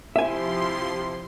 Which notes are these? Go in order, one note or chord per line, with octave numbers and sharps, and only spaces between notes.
C3 F3 E4 G4 E5 G#5 C6